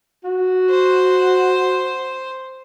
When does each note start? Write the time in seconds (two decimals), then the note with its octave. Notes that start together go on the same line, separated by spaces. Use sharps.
0.24 F#4
0.71 C5